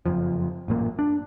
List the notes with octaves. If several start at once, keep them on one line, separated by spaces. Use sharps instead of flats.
F#1 F2 F3
A1 F#2 A#2 A#3
D4